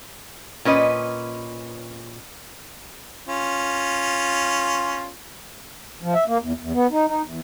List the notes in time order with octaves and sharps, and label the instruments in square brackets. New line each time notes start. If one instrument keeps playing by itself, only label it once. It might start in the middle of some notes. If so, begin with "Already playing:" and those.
[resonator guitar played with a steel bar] A#2 C#4 B4 D#5
[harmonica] C#4 F4
[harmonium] F3
E5
A#3
E2
E2
B3
D#4
D#4
E2